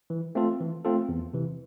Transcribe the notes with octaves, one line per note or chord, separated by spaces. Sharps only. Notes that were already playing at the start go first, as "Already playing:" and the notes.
E3
A3 C4 F4 A4
E3
A3 C4 F4 A4
E2
C3 E3